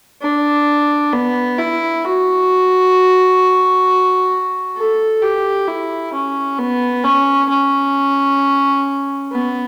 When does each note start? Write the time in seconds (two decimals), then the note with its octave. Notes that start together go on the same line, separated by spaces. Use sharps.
0.21 D4
1.13 B3
1.58 E4
2.04 F#4
4.77 A4
5.22 G4
5.68 E4
6.13 C#4
6.59 B3
7.04 C#4
7.50 C#4
9.32 B3